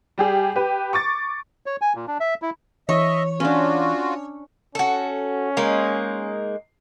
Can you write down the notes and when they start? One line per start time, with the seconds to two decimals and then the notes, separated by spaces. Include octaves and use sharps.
0.18 G3 G4 G#4
0.56 G4 B4
0.93 C#6 D6 A6
1.66 C#5
1.81 G#5
1.95 A#2
2.08 D4
2.20 E5
2.42 E4
2.89 E3 C#5 D#5 E5
3.40 C#4 D4 F4 F#4
4.75 C#4 F#4 A4
5.57 G#3 A#3 D#4